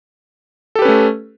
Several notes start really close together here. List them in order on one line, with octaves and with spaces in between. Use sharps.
A4 G4 B4 C#4 A3